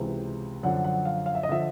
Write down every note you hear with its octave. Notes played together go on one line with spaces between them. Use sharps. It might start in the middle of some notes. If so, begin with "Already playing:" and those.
Already playing: C#2 C3 E3
F#2 D3 F3 F#5
F#5
F5
F5
E5
D#5
D3 F3 E5